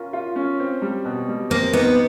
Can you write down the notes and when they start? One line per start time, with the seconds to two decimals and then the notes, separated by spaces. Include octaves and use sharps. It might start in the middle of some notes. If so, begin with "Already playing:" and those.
Already playing: C#4 F4 A#4
0.13 F4
0.36 C#4
0.60 C4
0.82 G3
1.05 B2
1.28 G3
1.50 A#3 C4
1.73 B3 D#4